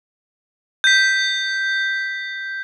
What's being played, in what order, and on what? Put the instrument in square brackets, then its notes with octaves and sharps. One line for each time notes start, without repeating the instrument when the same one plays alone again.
[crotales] G6 B6